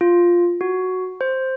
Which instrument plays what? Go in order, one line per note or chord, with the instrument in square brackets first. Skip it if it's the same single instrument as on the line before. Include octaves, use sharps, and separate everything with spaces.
[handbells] F4
F#4
C5